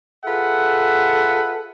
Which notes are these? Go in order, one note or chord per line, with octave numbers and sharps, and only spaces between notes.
F4 G#4 A4 B4 E5 F#5